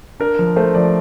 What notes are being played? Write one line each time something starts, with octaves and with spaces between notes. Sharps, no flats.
D4 A#4
F3
A3 C5
F3 D5